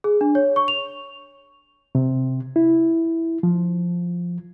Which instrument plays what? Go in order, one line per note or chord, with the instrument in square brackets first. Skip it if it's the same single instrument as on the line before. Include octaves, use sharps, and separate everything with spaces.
[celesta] G#4
D4
C#5
C#6
F7
[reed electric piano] C3
E4
F3